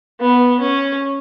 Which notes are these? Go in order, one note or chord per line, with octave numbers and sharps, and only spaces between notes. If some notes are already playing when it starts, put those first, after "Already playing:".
B3
C#4